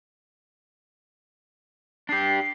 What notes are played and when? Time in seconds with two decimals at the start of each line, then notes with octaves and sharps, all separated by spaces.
2.09 D4 G4 C7